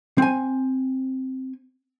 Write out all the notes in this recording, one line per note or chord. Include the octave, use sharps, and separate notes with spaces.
C4 G#5